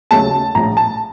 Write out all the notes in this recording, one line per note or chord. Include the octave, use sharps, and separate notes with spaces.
D#2 C#3 F#3 A3 A5
A#1 A2 F3 A#5
A5